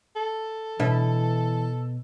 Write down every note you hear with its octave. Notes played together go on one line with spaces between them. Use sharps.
A4
B2 E3 D4 E5